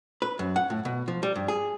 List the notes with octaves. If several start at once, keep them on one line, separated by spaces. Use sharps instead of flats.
B4
F#2
F#5
A2
B2
F3
G3
G2
G#4